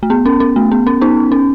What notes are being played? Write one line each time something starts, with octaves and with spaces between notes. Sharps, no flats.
A3
B3
C#4
C#4
A3
B3
C#4
B3 D#4
C#4